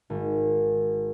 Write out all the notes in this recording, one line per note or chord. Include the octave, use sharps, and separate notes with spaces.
G#1